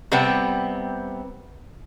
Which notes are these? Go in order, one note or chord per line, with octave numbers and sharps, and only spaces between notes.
C3 G3 B3 C4